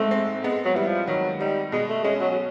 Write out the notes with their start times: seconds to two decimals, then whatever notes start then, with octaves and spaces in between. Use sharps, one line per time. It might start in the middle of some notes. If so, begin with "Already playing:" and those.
Already playing: G#2 A3 C4
0.11 C4
0.44 G#3 B3
0.65 F#3
0.76 E3 G3
0.87 F3
1.07 D#3 F#3
1.40 G3 D#4
1.72 B2 G#3
1.89 A3
2.04 G#3 C#4
2.20 F#3
2.31 F#3